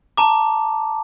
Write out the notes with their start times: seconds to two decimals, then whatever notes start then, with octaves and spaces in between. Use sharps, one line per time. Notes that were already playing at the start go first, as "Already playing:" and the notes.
0.17 A5 A#5 D6